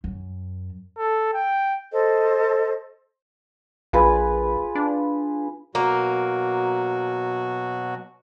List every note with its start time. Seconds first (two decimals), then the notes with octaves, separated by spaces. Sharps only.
0.04 F#2
0.98 A4
1.34 G5
1.92 A4 C5 D#5
3.93 A#1 F4 G#4 B4
4.75 D4
5.75 B2 F#3 A#3 F#4